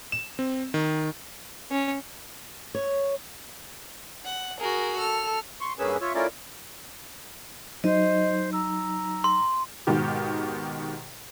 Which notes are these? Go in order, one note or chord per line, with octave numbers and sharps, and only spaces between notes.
E7
C4
D#3
C#4
C#5
F#5
F#4 G#4 A#4
A4 F6
C6 C#6
G2 A#3 C#4 G#4 B4 E6
F4 C#5 E5
A3 C#4 E4 F4 A#4 D5
F#3 D#4 C5 D#5
A#5 E6
C6
G#2 B2 D#3 G4